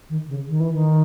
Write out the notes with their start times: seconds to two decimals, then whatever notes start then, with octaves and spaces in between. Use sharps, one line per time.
0.09 D#3
0.28 C#3
0.48 D#3
0.60 E3
0.74 D#3